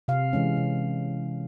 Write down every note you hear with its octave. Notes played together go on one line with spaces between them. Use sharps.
C3 F5
E3 G#3 C#4
C3